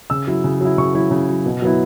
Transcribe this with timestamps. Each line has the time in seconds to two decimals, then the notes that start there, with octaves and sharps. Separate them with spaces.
0.10 C#3 E6
0.27 F#3 E4
0.44 C#3
0.61 F#3 E4
0.78 C#3 C#6
0.95 F#3 E4
1.11 C#3
1.29 F#3 E4
1.46 B2
1.62 F#3 B3 E4